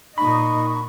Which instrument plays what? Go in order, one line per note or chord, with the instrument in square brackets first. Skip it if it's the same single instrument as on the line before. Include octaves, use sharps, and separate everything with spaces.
[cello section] A#2 D#5 [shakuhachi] D#4 [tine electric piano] B5 [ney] C#6